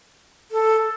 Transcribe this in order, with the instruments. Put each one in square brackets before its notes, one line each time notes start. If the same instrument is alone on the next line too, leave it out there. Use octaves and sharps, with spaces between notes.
[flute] A4